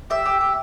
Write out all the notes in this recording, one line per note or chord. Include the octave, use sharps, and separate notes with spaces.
G4 E5
G4
G4